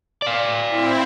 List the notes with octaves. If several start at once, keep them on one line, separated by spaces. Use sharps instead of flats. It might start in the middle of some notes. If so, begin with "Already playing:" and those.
D5 F5
C4 E4